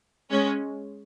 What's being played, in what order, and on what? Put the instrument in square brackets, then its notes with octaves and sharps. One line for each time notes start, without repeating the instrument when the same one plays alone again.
[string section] G#3 C#4